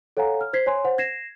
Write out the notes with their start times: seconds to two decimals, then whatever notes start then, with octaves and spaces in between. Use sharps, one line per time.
0.17 A4 C#5 F5 F#5 G#5 A#5
0.41 F6
0.53 C5 G#6 B6 C7
0.66 C#5 G#5 C6
0.85 C5 F#5
0.98 G#6 A#6 C7 E7